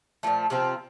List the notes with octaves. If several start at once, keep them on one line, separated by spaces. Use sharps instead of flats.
A#2 F3 A3
C3 F3 C4 F4